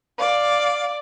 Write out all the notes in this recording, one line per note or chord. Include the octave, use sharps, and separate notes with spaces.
D5 F5